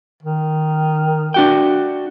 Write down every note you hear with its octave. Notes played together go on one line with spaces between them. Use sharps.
D#3
D4 F#4 G5